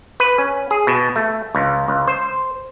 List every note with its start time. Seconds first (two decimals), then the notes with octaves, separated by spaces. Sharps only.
0.20 B4
0.38 C#4
0.71 G#4
0.87 B2
1.16 A3
1.55 C#2
1.88 C#2
2.07 C5